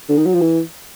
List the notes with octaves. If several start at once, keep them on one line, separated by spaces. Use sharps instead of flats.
D3
D#3
F#3
F3
E3